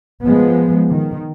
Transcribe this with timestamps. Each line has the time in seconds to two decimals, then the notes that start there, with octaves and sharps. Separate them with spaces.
0.23 F3 G#3 B3
0.91 D#3